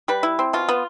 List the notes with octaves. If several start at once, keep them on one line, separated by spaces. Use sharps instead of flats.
G3 B4
E4
C4
B2 F4
B3